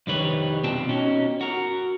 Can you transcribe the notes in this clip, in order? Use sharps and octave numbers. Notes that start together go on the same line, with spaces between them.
C2 F2 D#3 G3 B4 C#5
B2 C4 F4 G5 A5
B2 C#4 D#4
F#4 A#4